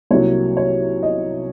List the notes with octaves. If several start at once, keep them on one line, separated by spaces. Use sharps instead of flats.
C2 C3 F#3 A#3 C#5
C#5
D#5